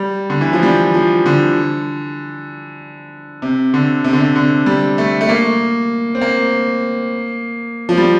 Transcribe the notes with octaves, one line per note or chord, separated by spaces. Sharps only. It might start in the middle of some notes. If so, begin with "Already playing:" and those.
Already playing: G3
D3
E3
F3
G3
F3
D3
C3
D3
C3
D3
C3
D3
G3
A3
A3
A#3
C4
A#3
F3
G3